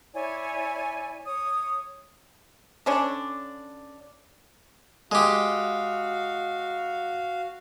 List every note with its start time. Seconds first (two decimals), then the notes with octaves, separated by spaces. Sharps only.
0.14 E4 C#5 D5 G#5
1.25 C#5 D#6
2.86 D3 C#4 D4
5.12 G#3 F#4 G4 F5